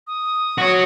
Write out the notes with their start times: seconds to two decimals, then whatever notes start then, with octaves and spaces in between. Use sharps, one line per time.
0.07 D#6
0.58 F#4 C#5